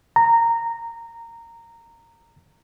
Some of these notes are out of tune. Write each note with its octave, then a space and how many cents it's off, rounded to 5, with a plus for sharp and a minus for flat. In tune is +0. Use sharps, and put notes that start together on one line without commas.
A#5 -15